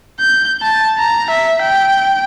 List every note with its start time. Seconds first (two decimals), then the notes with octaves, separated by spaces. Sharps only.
0.20 G6
0.62 A5
0.99 A#5
1.30 E5
1.62 G5